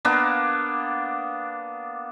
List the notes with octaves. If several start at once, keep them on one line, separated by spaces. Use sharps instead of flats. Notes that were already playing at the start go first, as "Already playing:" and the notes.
A#3 B3 D4